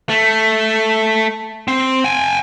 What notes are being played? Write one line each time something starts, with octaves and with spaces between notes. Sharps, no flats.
A3
C4
G5 G#5